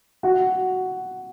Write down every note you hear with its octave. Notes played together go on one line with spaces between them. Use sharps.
F#4